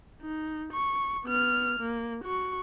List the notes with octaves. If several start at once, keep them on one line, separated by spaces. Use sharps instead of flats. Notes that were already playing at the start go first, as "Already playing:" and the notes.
D#4
C#6
B3 F6
A#3
F#4 C#6